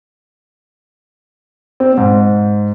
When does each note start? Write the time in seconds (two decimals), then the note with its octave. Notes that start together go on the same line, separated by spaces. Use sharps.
1.80 C4
1.97 G#2